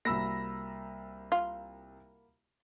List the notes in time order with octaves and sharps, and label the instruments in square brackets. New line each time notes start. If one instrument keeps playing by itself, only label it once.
[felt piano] C2 E6 A#6 [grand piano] A#3 F#4 B5
[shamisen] F4